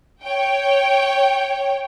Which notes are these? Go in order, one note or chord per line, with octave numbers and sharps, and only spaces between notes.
C#5 G5